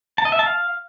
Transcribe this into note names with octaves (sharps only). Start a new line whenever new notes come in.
A5
D#5
E5
A5
F5